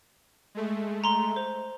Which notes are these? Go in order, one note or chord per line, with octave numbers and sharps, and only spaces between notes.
G#3 A3
A#5 C6
C5